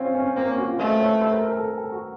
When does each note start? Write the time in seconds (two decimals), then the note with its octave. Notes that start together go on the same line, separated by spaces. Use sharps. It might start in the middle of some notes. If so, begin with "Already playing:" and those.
Already playing: C4 C#4 F4
0.15 C#4
0.36 A#3 C4
0.47 C#4
0.58 F#4
0.68 F4
0.78 A3 C5
1.00 C#5
1.21 C5
1.32 A#4
1.42 A#4
1.53 A4
1.64 A4
1.78 A4
1.92 F#4